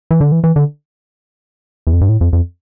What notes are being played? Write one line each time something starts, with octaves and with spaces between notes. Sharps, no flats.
E3
D3
E3
E3
D3
E2
F2
G2
A2
F2
F2